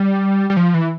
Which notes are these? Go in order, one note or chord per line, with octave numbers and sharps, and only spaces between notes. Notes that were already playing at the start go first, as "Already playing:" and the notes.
Already playing: G3
G3
F3
E3